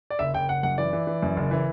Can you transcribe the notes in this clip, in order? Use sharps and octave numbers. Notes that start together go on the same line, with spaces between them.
D5
F#1 E5
F#1 G5
F#1 F#5
F#2 F#5
E3 D5
E3
E3
F#2
F#1
E3